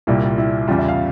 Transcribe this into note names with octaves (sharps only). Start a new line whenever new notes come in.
C2 A#2 G3 E4
F4
E4
E2 C#3 G3 F4
E5
F5